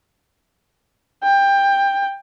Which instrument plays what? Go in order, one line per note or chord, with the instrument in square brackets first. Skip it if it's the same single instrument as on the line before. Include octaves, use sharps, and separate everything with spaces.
[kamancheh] G5